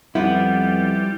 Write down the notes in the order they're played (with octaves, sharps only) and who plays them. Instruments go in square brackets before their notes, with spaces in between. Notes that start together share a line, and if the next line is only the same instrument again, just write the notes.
[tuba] F2 [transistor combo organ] G3 [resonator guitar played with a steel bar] B3 [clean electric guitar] E4 B4